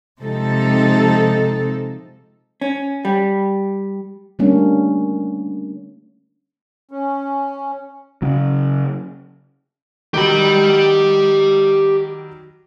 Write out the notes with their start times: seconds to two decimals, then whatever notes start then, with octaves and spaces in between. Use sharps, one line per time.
0.21 C3 F3 G#3 C4 D#4 A4
2.61 C#4
3.05 G3
4.39 D3 G3 A3 A#3 C#4 D4
6.91 C#4
8.22 C#3 F#3
10.14 D#3 F#3 G3 G4 B5